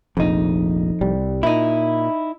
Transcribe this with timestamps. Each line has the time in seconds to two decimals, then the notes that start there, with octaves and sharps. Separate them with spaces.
0.17 F1 A#1 F2 D#4
1.01 C2 G3
1.43 A#2 D#4 E4